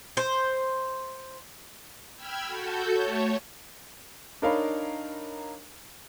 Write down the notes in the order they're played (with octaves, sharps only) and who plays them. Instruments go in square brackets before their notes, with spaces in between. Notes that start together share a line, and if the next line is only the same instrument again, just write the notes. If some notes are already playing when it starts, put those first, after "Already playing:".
[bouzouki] C5
[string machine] G5 B5 E6 F6 G#6
F#4 A4 G6
A3 C#5
[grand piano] D4 D#4 A#4 C#5 F5 B5